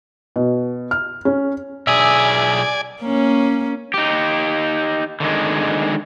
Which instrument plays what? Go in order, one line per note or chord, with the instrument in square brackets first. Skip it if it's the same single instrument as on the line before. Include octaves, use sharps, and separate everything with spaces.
[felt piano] B2
F6
C#4
[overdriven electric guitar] B1 G#4 [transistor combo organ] D5 G#5 [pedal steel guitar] E5
[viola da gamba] A#3 C#4
[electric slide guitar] D#4 G4
D3 D#3 G#3